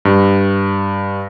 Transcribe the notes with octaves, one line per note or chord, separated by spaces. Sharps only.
G2